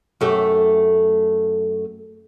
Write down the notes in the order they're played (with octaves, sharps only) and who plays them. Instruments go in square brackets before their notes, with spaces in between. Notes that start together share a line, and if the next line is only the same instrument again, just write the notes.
[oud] F#2 A3 G4